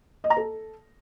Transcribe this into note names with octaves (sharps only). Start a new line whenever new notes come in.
D#5
A#5
A4